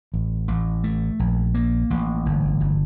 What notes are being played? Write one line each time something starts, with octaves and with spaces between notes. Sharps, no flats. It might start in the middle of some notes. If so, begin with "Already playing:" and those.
A1
A1
A3
A#1
A#3
A1
G1
G1